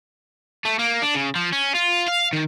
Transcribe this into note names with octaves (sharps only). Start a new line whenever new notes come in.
A3
A#3
D4
C#3
F3
C#4
F4
F5
D#3